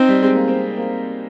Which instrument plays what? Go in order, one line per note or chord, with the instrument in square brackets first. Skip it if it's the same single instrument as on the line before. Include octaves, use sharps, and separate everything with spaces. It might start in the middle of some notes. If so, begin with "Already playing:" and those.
Already playing: [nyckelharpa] C4 [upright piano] D#4
[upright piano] G3
G#3
A#3
C4
A#3